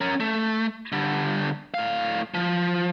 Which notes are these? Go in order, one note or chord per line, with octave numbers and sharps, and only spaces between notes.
C#4 A#4
A3
D3 G3
A2 F5
F3